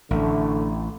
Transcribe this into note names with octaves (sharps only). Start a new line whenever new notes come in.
A1 D3 A3